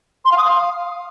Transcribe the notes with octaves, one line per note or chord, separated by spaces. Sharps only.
C6
F5
D#6
F5